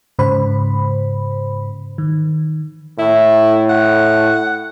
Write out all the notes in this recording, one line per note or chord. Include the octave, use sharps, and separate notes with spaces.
G#2 C#3 C5 B5
D#3
A2 E4
F#5